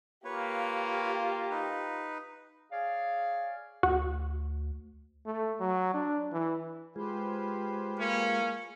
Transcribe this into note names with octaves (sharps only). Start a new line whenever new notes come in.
A#3 F4 G4 B4 C#5
D#4 B4
G#4 C#5 D5 F5
D2 F#4
A3
F#3
D4
E3
G#3 F4 G4 G#4 B4 C5
A#3 C#4